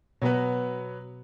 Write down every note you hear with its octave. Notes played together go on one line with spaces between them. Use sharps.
B2 F#3 B3 F#4 B4